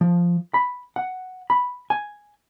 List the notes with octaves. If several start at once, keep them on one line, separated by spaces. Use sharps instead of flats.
F3
B5
F#5
B5
G#5